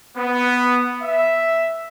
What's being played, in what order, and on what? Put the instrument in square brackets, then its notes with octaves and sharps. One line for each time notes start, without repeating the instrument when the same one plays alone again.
[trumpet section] B3
E5